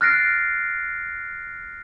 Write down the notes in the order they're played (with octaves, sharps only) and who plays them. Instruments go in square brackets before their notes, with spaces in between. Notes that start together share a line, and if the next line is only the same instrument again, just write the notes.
[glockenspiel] F6 F#6 A6 A#6 C7 D7